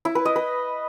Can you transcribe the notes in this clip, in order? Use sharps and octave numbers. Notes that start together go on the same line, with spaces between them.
E4
B4
D#5
B4